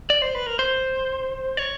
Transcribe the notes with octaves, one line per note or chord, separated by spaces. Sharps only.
D5
C5
B4
A#4
C5
C#5